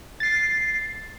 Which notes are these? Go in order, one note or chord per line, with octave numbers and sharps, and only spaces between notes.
A6 C7